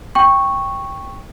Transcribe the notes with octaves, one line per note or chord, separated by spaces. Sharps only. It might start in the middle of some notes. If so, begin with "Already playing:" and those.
G5 C#6